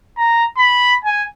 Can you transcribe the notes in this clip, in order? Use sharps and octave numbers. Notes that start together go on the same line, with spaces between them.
A#5
B5
G#5